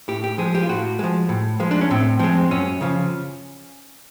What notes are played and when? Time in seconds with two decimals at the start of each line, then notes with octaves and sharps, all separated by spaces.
0.08 A2 G4
0.24 G4
0.38 F3 G#3 G#4
0.55 G4
0.62 F4
0.69 A2 F#4
0.99 F3 G#3
1.29 A2
1.60 F3 G#3
1.71 D4
1.81 C#4
1.90 A2 C4
2.19 F3 G#3 C4
2.51 F#2 C#4
2.81 C#3 F3